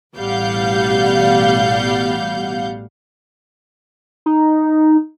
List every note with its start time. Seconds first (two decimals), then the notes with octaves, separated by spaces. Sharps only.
0.16 A1 B2 G3 F5 F#5 G6
4.26 D#4